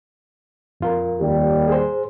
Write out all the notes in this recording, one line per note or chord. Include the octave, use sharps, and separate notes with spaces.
F2 F4 A#4
D#2 G3
G#4 C5